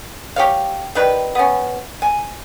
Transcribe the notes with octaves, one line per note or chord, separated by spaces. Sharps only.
G4 C#5 F5
D#3 G3 B4
B3 C#4
G#5